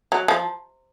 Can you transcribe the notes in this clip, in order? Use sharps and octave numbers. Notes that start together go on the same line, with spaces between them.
F#3
F3